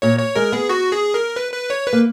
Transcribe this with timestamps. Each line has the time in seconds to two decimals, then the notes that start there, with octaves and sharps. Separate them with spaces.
0.02 A#2 C#5
0.19 C#5
0.36 G#3 A#4
0.52 B3 G#4
0.69 F#4
0.92 G#4
1.14 A#4
1.36 B4
1.53 B4
1.70 C#5
1.87 B4
1.93 A#3